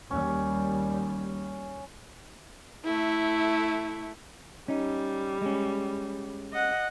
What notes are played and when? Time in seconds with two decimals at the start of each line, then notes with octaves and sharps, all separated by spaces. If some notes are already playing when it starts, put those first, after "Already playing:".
0.11 D#2 G3 C#4
2.85 A3 E4
4.68 G3 C#4 D#4
5.42 G#3 C#4
6.52 D#5 F#5